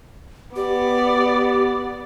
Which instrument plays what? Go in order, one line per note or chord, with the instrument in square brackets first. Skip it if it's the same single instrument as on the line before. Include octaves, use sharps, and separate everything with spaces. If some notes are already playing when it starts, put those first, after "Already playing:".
[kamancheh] B3 D5 [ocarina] G4